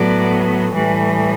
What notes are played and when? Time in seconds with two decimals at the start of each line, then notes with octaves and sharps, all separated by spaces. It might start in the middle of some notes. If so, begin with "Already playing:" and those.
Already playing: A2 F#3 B3 D5
0.74 A2 E3 G3